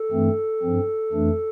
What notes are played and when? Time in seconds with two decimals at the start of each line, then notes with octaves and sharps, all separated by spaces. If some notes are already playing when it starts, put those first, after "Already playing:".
Already playing: A4
0.11 G2 E3 A3 C4
0.62 G2 F3 C4
1.12 F2 E3 A3 D4